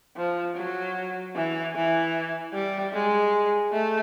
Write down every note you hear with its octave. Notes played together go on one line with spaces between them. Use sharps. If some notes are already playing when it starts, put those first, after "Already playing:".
F3
F#3
E3
E3
G3
G#3
A3